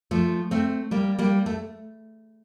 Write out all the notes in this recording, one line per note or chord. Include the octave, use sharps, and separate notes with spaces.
F3 A3
A3 C4
G3 A#3
G3 A#3
A3